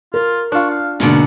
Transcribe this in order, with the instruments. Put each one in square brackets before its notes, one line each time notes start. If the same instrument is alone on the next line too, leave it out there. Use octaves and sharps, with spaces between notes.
[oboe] F4 [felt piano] A#4
[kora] D4 F4 [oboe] C#6
[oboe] F5
[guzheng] G#2 B2 D3 [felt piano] A#3 D4 [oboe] F4